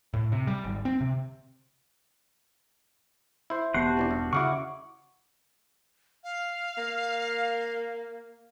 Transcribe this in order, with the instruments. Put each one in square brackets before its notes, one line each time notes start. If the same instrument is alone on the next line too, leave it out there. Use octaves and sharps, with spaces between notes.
[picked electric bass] A2
C3
G3
G#1
C4
C3
[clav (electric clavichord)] E4 C5
[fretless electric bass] E1 E2 B3 [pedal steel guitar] F#4 F#5 C6 [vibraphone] G4 A5
[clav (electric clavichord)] C3 E3 D4
G2
[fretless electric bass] C#3 [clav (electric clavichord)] E4 F#4 F5 [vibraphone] F#5 [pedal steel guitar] C#6 D6
[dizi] F5
[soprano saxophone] A#3